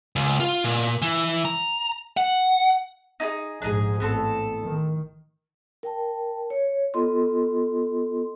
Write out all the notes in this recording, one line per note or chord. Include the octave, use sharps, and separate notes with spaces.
C#2
F4
A#2
E3
A#5
F#5
D#4 E4 G#4
A#1 G#2 D4 D#4 G#4
A1 B3 C4 A4
D#3
A#4 G5 A5
C#5
B3 F4 A4 D#5 C6